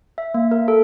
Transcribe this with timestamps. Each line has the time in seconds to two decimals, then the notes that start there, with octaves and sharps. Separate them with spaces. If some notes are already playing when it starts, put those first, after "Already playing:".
0.18 E5
0.34 A#3
0.51 A#4
0.68 A4